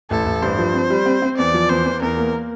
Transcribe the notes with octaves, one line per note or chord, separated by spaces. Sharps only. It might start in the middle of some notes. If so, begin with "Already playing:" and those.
A1 A4
A1
G2 C5
F3
C4
G3
C4
C4
E2 D5
F3
E2 C5
E2
E2 A#4
A#3